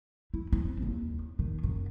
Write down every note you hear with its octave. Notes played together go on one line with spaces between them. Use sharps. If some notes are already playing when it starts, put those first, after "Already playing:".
E4
C4
D#2
D#3
F#2